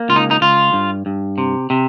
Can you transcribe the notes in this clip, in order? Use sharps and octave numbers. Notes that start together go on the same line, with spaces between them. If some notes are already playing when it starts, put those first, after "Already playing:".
Already playing: A#3
C#2 F4
D#4
D#4
C#2 F4
G2
G2
C3
C3